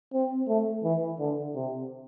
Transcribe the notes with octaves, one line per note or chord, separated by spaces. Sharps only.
C4
A3
E3
D3
C3